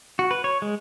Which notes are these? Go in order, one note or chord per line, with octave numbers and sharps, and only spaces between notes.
F#4
B4
C#5
G#3